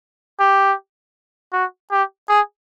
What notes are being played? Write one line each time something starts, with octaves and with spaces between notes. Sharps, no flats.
G4
F#4
G4
G#4